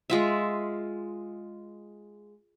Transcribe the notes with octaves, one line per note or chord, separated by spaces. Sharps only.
G#3 F4 E5